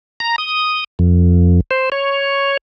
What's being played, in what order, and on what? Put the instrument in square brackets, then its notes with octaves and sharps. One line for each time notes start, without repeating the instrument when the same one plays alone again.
[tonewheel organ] A#5
D#6
F2
C5
C#5